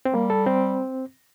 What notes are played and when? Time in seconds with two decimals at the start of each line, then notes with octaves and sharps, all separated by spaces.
0.05 C4
0.14 G3 A#3
0.30 A4
0.46 C4